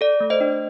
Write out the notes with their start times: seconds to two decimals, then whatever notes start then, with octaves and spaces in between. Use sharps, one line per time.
0.01 A4 D5
0.20 A3
0.30 C5 D#5
0.41 D4